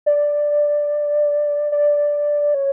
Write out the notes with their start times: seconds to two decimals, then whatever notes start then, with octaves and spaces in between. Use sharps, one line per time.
0.06 D5
1.72 D5
2.54 C#5